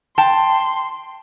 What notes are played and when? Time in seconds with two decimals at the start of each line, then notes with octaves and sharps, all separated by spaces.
0.18 G5 A5 C6